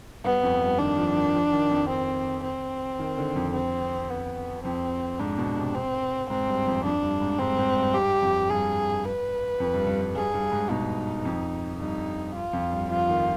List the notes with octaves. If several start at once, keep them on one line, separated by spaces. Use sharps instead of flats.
G2 B3
F2
G2
D#3 D4
F3
D#3
F3
D#3
F2
C4
C4
D#3
D3
F2
C4
B3
F2 C4
G#2 D4
B2
C3
C4
G#2 C4
G2
F2
F2 D4
G2
G#2
G#2 C4
G#2
G2
G2 G4
F2
G2 G#4
B4
F2
G2
G2
G2
G2 G#4
G2
G#2
B2 D#4
F2
G2 D#4
F4
F2
G2
F3 F4
D#3